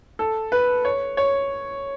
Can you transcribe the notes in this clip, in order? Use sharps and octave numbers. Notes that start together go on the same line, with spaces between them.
A4
B4
C#5
C#5